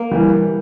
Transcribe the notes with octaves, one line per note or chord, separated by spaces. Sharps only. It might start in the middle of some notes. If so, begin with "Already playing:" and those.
Already playing: A#3
E3 G3